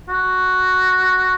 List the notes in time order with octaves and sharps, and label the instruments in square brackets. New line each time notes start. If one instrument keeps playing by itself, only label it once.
[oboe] F#4